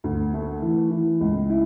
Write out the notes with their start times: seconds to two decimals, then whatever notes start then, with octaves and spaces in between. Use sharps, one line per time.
0.04 D2
0.34 A3
0.62 E3
0.91 E3
1.21 C#2
1.50 E4